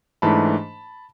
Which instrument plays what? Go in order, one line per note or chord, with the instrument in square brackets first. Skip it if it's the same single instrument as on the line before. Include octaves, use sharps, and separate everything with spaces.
[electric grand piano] G#2 E3 A3 D4 A5 B5